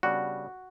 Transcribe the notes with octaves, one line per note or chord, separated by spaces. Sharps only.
C#3 G3 B3 D4 F#4